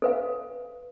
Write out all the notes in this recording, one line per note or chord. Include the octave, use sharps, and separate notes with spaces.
A4 B4 F5